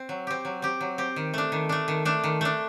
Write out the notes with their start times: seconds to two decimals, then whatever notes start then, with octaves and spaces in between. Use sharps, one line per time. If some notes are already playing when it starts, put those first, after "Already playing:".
Already playing: C4
0.09 F#3
0.27 C4 G4
0.45 F#3
0.62 C4 G4
0.81 F#3
0.98 C4 G4
1.16 D#3
1.34 A3 D4
1.52 D#3
1.69 A3 D4
1.88 D#3
2.05 A3 D4
2.24 D#3
2.41 A3 D4